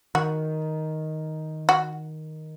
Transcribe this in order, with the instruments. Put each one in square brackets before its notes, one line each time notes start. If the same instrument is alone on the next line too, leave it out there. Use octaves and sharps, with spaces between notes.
[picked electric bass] D#3 [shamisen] F#4
[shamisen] F#4